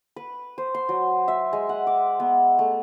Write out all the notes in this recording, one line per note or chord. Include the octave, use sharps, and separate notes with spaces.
B4
C5
C6
F#3
E5
G#3
F#5
D6
B3
A3